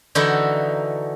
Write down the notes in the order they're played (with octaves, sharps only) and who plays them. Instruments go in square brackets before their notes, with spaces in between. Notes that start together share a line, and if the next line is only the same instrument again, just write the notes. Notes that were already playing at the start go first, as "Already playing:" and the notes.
[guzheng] D3 E3 D#4 E4 F#4